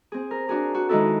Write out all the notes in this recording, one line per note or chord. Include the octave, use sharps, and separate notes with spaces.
C4 G#4
A#4
D4 F#4 G#4 A#5
F#4
D#3 G#3 D#4 E4 F#4 A4